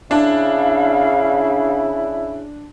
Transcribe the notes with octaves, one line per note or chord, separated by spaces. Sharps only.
C#3 D4 E4 F5